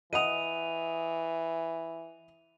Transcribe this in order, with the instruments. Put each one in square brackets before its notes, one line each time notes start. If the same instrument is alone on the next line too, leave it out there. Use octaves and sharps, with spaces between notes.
[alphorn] E3 [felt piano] D#5 F#5 D#6 [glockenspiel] D#7 F7